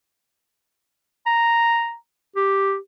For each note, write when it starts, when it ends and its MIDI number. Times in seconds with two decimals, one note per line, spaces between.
1.26 1.95 82
2.36 2.77 67